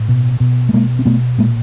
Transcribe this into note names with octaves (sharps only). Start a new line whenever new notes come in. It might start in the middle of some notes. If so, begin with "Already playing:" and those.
Already playing: A2
B2
B2
A3
B2 G#3 A#3
C4
B2 A3 B3
A#2 G#3 A#3